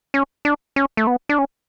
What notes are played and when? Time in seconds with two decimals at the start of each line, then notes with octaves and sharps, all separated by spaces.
0.14 C#4
0.45 D4
0.76 C#4
0.97 A3
1.07 B3
1.29 D4
1.39 C#4